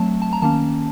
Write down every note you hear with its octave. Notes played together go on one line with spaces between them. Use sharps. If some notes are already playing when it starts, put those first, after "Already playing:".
Already playing: F#3 A3 C4 A5
A5
A#5
D#3 A#3 C#4 A5